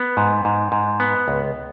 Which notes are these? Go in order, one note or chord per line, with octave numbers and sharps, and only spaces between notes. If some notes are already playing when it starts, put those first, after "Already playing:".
Already playing: B3
G#2
G#2
G#2
B3
C#2